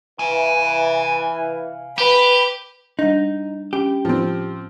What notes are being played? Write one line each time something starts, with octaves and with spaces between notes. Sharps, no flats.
E3 F5 G#5
G4 B4
G3 D4 D#4
C#4 G4
A2 F3 C4